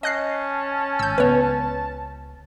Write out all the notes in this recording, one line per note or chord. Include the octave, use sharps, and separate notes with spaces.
C#4 D#5 A5 F#6 C7
G#1 E6 G6
C#2 B3 B4 C#5